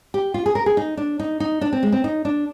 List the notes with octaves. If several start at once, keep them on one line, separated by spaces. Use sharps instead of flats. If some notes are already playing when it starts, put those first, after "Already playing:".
G4
F4
G#4
A#4
G#4
D#4
D4
D#4
D#4
D4
C4
G#3
C4
D#4
D4